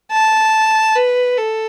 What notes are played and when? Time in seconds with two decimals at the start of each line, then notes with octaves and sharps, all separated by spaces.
0.12 A5
0.95 B4
1.38 A4